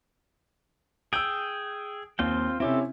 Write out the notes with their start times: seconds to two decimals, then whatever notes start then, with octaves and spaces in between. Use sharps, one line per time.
1.13 G#4 G5 E6 D7
2.19 D#2 C4 F4 G5
2.60 C3 C4 C#4 E4 G4 A4